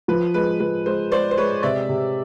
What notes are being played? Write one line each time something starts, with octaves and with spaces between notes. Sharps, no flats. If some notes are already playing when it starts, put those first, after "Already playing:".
F3 B4
G#3 B4
F3 B4
G#3 C5
G#3 C5 D5
C5
G#3 B4 C#5
C3 D5 E5
C3